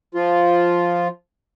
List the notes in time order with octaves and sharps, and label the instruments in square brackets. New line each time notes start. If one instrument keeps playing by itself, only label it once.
[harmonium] F3 F4